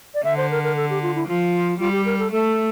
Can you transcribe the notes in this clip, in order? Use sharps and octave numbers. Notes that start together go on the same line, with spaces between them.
D5
D3 E5
C5
A#4
A#4
A4
G4
F4
E4
F3 F4
G3 F4
G4
A#4
A4
A3 A4